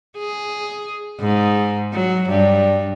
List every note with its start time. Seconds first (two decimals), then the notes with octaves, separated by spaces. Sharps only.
0.18 G#4
1.20 G#2
1.93 F#3
2.30 G2